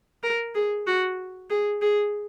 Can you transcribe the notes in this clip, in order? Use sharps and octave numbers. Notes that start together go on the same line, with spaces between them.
A#4
G#4
F#4
G#4
G#4